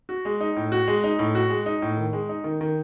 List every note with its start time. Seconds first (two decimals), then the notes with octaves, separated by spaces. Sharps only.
0.09 F#4
0.25 G#3
0.40 D#4
0.56 A2
0.72 F#4
0.88 G#3
1.04 D#4
1.19 A2
1.35 F#4
1.50 G#3
1.66 D#4
1.82 A2
1.97 D#3
2.13 G#3
2.29 D#4
2.44 D#3
2.61 D#3